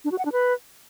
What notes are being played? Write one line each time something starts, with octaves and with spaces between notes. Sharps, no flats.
D4
F#4
F#5
D4
B4